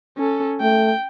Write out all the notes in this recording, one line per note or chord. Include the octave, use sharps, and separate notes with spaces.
C#4 A4
A3 G5